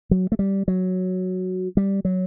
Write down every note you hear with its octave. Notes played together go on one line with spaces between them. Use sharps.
F#3
A3
G3
F#3
G3
F#3